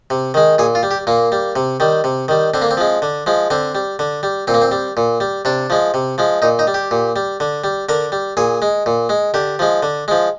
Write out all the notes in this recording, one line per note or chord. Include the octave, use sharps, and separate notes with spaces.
C3
D#3 G#3
A#2 G#4
F4
G3
G4
A#2 A#3
G3
C3
D#3 G3
C3
D#3 G3
D3 C4
A#3
C4
F3 G#3
D3
F3 G#3
D3 C4
G3
D3
G3
A#2 C4
A#3
C4
G3
A#2
G3
C3 D4
F3 G#3
C3
F3 G#3
A#2 D#4
D#4
G3
G4
A#2
G3
D3
G3
D3 A#4
G3
A#2 G#4
G#3
A#2
G#3
D3 G4
F3 G#3
D3
F3 G#3